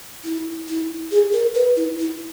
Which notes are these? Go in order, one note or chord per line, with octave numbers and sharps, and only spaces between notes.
E4
E4
G#4
A#4
B4
E4
E4